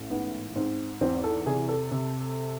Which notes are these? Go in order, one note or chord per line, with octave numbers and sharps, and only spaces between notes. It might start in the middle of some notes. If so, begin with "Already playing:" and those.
Already playing: A1
G#2 B3
G#2 C4
E2 C4
A4
C3 G#4
A4
C3